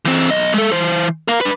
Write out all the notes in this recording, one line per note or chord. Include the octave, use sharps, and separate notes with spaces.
E3 C4
B1 D#5
G#3 A4
E3 C5
A#4 F5
D4 B4